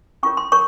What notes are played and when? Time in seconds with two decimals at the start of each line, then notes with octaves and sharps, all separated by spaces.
0.23 C#4 F4 A#4 C#5 C#6
0.37 C6
0.52 A#4 C#5 C#6